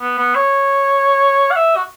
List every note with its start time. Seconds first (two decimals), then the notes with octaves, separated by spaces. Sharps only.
0.01 B3
0.18 B3
0.35 C#5
1.51 F#5
1.56 E5
1.76 F#4